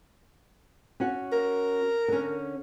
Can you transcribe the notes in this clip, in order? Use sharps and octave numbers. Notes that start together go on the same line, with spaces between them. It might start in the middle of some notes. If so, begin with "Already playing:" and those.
C#4 F#4 F#5
A#4
D3 C#4